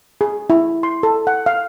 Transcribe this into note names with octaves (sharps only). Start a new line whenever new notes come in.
G#4
E4
C6
A4
F#5
F5